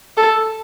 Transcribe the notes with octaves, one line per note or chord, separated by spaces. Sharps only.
A4